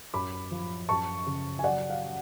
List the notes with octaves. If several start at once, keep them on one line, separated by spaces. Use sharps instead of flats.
F#2 B5 D6
F3
F#2 A5 C#6
C#3
G#5
F#3 D5 F#5
F5